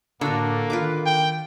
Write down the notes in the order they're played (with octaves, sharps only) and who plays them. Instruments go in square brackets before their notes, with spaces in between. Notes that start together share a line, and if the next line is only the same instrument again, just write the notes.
[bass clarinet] A2 [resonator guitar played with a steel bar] D3 [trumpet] A#3 [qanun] D4 F#4 A4
[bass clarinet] D#3 [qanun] F4 B4 D6
[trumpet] G5